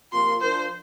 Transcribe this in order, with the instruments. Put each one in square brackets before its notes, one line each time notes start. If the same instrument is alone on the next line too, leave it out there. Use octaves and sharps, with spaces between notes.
[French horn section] C3 F3 A#3 F4 A#4 [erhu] C6
[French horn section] F3 D4 F4 A#4 [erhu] C5